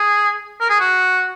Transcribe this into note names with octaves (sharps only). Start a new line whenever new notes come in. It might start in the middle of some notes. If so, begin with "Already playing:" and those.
Already playing: G#4
A#4
G#4
F#4